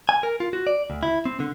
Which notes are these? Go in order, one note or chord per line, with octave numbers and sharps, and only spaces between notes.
G#5
A#4
F4
F#4
D5
D2
E4
C4
D3